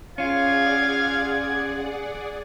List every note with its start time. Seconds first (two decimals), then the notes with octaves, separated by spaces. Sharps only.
0.18 C#4 F4 G#4 D5 F5 F#5 G#6